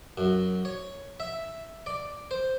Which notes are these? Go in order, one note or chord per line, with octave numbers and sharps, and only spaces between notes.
F#2
C#5
E5
D5
C5